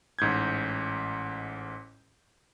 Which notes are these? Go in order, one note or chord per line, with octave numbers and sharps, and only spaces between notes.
A1 G#2 G6 G#6